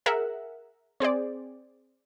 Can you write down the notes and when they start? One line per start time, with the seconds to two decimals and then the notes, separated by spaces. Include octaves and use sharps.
0.06 G#4 A#4 E5 F#5
1.00 C4 G#4 C5 D5